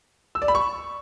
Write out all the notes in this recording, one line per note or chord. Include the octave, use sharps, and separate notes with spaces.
E6
D5
B5
C#6